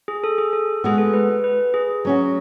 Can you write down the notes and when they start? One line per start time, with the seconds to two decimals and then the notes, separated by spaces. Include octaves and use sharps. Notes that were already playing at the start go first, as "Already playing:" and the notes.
0.08 G#4
0.24 A4
0.38 G#4
0.53 A4
0.84 G#3 B3 F#4 G#4
0.98 A4
1.14 B4
1.44 B4
1.74 G#4
2.05 F#3 C#4 F#4